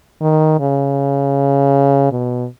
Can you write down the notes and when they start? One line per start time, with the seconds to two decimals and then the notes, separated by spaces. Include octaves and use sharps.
0.21 D#3
0.60 C#3
2.12 B2